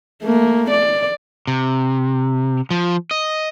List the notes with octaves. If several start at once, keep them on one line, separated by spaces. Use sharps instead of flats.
A3 A#3
D5
C3
F3
D#5